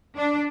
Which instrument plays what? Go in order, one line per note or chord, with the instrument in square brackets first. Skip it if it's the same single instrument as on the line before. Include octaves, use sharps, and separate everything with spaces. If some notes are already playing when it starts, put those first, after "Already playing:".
[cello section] D4